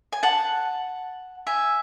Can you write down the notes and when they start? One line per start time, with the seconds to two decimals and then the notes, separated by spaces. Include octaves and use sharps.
0.12 G#5
0.23 F#5 A5
1.47 E5 G#5